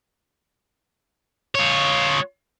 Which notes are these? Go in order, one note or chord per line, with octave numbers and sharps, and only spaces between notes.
F4 C#5